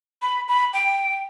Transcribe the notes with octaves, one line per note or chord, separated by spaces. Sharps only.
B5
B5
G5